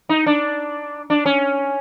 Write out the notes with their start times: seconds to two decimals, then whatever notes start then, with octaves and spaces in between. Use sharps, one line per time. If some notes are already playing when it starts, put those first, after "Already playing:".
0.09 D#4
0.26 D4
1.10 D4
1.26 C#4